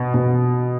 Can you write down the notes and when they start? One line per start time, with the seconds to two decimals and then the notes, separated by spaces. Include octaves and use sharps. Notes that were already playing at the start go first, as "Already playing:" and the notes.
Already playing: B2
0.14 B2